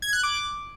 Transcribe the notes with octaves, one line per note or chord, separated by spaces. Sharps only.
G#6
F#6
D6